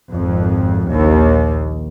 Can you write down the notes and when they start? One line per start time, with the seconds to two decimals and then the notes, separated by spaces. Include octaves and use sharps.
0.13 G#1 F2
0.90 A#1 D#2